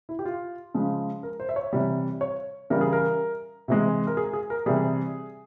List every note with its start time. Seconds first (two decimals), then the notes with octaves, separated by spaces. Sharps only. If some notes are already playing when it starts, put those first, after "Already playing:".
0.09 E4
0.19 G4
0.25 F4
0.75 C#3 F3 G#3
1.23 A#4
1.40 C5
1.49 E5
1.56 C#5
1.73 C3 E3 G3
2.21 C#5
2.70 C#3 E3 G3 A#4
2.81 G#4
2.93 A#4
3.68 C3 E3 G#3
4.07 A#4
4.17 G#4
4.33 G#4
4.50 A#4
4.66 C3 E3 G3 G#4